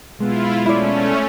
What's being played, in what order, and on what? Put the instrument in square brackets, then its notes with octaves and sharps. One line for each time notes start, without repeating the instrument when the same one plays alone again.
[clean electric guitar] B1 G#3 B3 [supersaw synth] E4 F4
[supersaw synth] A3 C#4 [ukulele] E4 D5